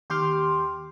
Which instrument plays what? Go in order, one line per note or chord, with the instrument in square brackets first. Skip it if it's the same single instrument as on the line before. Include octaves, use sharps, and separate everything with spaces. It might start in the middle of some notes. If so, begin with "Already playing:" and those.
[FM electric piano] D#2 G4 G5 C6 D6 F6